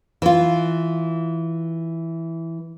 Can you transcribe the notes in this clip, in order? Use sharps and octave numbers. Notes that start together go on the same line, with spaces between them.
E3 F4